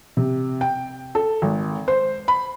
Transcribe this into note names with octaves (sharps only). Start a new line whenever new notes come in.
C3
G5
A4
G#1
C5
B5